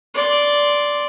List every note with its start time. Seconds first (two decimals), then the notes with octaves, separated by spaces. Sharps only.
0.15 D5 C6